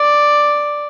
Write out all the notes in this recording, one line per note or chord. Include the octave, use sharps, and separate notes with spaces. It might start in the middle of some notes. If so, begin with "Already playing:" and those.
Already playing: D5